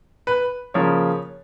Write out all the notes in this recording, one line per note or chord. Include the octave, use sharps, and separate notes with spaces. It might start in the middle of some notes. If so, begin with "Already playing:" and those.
B4
C#3 F3 A#3 C#5